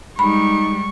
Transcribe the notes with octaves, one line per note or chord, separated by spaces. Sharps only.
G3 G#3 D#4 B5 C#6